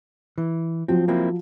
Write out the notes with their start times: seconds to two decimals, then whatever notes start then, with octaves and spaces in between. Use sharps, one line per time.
0.38 E3
0.88 F3 F#3 C4 F4
1.08 A#3 C4 E4